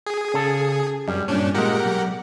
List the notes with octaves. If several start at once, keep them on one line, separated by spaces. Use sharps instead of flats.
G#4
C#3 A4
F#2 G3
G2 A#2 C#4 D4
A#2 G#3 G4 A#4 F#5
B1